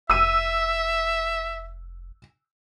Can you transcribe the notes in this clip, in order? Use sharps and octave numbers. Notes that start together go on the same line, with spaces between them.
F1 E5 E6 D#7